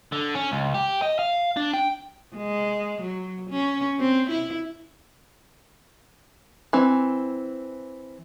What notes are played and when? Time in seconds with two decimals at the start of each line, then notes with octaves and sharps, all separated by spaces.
0.12 D3
0.35 C#4
0.52 C#2
0.74 G4
1.02 D#5
1.19 F5
1.57 D4
1.74 G5
2.37 G#3
3.02 F#3
3.50 C#4
3.99 C4
4.30 E4
6.73 E3 C4